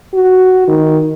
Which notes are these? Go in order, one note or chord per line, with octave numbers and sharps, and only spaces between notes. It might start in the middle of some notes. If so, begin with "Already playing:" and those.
F#4
D#3